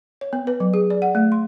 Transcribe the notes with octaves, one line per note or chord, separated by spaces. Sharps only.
C#5
B3
B4
F#3
G#4
D5
F#5
A3
C6